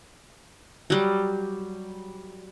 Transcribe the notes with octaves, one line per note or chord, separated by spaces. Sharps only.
F#3 G3